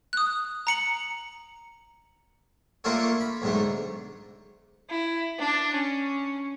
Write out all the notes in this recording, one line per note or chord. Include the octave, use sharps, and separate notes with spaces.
D#6 F#6
A#5 C#7 F#7
A3 A#3 D4 F4 A4 C#5
B5
B1 G#2 D3 A3
E4
D4
C#4